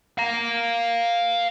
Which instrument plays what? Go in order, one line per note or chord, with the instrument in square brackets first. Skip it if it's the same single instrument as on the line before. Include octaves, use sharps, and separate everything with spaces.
[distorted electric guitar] F5 A#5